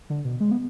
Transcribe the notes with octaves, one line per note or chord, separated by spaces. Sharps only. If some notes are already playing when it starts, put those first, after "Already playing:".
D3
B2
G#3
B3